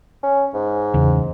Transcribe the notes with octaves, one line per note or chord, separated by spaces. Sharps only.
C#4
G#2
E2 C#3